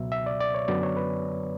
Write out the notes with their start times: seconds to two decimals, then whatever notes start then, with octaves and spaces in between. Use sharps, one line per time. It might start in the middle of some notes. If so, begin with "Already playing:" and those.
Already playing: C#2 B2 F#3 E5
0.12 E5
0.26 D5
0.40 D5
0.55 C#5
0.68 F#2 D3 F#3 B3 D5
0.83 C#5
0.96 B4